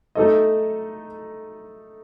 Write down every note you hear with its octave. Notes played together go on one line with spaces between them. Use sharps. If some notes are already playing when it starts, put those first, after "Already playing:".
A3 D#4 A4 D#5